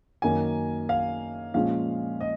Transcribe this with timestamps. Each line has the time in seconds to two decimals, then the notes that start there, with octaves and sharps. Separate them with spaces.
0.22 F#2 D#3 A#3 C#4 G#5
0.89 F5
1.54 A#2 F3 G#3 C#4 F5
2.21 D#5